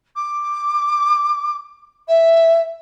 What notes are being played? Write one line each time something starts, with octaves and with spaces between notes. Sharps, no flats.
D6
E5